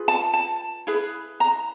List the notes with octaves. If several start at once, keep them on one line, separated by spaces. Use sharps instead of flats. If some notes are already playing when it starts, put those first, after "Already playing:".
Already playing: F4 G#4 B4
A5
A5
E4 G#4 B4
A#5